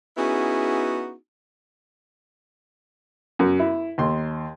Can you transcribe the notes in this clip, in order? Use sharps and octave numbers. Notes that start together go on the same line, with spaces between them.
B3 C#4 D#4 E4 F#4 G#4
F#2
E4
D#2 C6